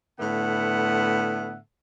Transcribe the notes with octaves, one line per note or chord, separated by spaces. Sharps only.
A2 D3 B3 E5 F#5